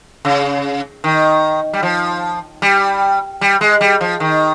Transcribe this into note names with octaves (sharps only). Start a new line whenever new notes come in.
C#3
D#3
G3
F3
G3
G3
G#3
G3
F3
D#3